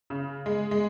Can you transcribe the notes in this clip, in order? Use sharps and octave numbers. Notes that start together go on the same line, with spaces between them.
C#3
G#3
G#3